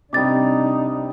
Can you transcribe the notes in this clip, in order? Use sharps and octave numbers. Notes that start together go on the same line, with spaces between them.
C3 G3 D4 D#4 D6 A6